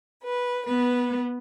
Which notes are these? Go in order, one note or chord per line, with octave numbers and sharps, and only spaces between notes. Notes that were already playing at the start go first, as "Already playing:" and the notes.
B4
B3 B4